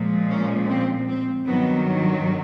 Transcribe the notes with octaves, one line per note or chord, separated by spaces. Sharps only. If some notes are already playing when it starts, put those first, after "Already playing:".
Already playing: A#2 F3 G#3
C#4
C4
C4
G2 D#3 F#3 B3